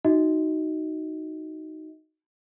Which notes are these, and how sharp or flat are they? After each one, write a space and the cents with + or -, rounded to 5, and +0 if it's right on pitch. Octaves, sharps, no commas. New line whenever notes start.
D#4 +0 F#4 +10 D#5 +30